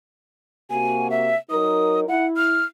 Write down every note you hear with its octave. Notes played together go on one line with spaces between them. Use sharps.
C3 A#3 F#4 G#5
E5
F#3 D#4 A#4 D#6
E4 F#5
F6